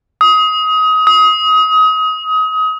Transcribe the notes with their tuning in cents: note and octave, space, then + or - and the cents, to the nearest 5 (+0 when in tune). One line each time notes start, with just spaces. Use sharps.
D#6 +25
D#6 +30